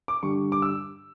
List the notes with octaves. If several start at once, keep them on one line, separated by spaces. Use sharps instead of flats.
D6
G2 D3 G3 D4 C#6
D6
E6